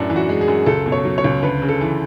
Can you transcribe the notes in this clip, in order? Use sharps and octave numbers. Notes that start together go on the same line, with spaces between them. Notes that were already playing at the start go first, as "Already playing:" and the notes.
Already playing: F#2 A2 D4
E3
F#4
G#3
G#4
F#2
C#2 A4
B2
C#5
F#3
C#5
C#2
D2 B4
C#3
A4
E3